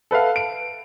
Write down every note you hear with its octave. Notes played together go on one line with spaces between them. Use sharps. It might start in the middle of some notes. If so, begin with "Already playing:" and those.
A4 B4 E5 F5
D7